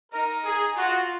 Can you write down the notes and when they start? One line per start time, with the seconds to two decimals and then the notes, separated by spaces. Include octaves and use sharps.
0.13 D#4 A#4
0.45 G#4
0.76 F4 F#4